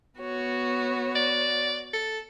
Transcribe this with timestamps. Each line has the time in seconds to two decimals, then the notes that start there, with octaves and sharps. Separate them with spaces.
0.19 B3 F#4 C#5
1.16 D5
1.93 A4